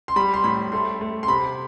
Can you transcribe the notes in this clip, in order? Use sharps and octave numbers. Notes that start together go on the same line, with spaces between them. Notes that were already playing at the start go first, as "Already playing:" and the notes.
C6
G3 B5
C6
A2 B5
A3 C6
A3
C6
C3 B5